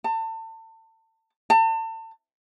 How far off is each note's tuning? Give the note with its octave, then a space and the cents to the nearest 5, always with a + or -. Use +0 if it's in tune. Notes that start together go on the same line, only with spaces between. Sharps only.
A5 +30
A5 +35